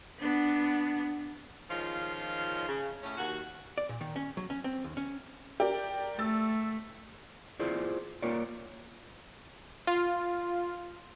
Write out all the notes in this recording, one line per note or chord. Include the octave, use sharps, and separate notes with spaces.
B3 D4
D#3 F3 G#3 C#4 F4
C#3
A2 C#4
D#2 F#4
D5
A#2
D#3
C#4
F#3
C#4
C4
D#2
C#4
G4 A#4 D5
A3 E6 A6
E4 F4 G#4 C5 D5
A#3 F4 A#4 C#5 D5
F4